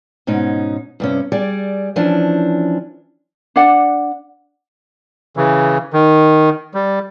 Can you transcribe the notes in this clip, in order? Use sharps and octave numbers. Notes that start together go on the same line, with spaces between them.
G#2 B2 C#4 D#4
G2 C3 C#4
G3 G#4 D5
E3 F3 C#4 D4
D4 D5 F#5
C#3 E3
D#3
G3